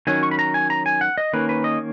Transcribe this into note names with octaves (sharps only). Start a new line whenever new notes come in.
D#3 F#3 C#4 G#5
C#6
B5
A#5
G#5
A#5
G#5
F#5
D#5
D#3 A#3 C#4 B4
B4
D#5